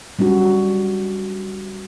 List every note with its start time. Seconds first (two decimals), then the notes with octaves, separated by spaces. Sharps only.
0.19 G3 C#4 D4 F#4